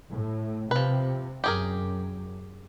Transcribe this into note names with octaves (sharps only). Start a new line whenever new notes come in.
A2
C3 F3 B4
F#2 G4 G#4 A#4